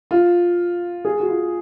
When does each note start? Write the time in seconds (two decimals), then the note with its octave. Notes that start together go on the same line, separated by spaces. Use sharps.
0.11 F4
1.05 G#4
1.20 F#4
1.29 F4